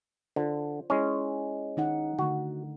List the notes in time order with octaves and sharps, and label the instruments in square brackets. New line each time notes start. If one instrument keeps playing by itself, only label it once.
[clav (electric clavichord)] D3 [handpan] F4 C5
[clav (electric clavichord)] G#3 C#4 [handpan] E4
[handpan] D#3 D#4 F#5
[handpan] D3 A3 [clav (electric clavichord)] F#4